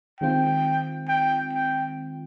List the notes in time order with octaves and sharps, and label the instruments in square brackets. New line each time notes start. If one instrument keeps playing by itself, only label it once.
[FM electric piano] D#3 G#3 C4 F4 [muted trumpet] G5
[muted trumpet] G5
G5